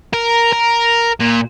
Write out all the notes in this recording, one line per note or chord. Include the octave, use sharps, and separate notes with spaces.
A#4
A#4
A#2